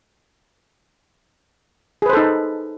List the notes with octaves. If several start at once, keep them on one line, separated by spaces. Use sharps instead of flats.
D#4 G#4 A4 B4 C5